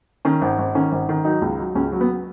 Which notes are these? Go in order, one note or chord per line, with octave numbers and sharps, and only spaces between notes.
D#3 C#4
G#1
G#1
D#3 C#4
G#1
D#3
F#3 D#4
C#2
F#3
C#2 C#4
F#3
B3